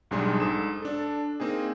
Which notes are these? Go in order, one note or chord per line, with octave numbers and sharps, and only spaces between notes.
B1 G#2 G3 D4 G#4 C6
G#2 A4 D#6 E7
D4 A4
A#3 C4 D#4 G#4